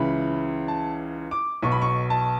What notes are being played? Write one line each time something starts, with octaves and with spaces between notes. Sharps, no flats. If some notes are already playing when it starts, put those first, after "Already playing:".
Already playing: C#2 C#3 E3 B5
A5
D6
B1 B2 C#6
B5
C#6
A5